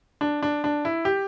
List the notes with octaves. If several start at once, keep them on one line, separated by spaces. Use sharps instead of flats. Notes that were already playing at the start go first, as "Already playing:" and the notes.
D4
D4
D4
E4
G4